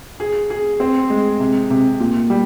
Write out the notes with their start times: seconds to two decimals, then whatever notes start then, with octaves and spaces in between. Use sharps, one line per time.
0.20 G#4
0.50 G#4
0.80 C4
1.10 G#3
1.40 C3
1.70 C3
2.00 A#2
2.30 G3